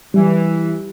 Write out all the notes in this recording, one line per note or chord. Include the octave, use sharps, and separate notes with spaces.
E3 G3